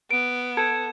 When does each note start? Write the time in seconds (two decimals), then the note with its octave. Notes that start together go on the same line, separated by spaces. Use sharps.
0.11 B3 D7
0.57 A4 G#6 E7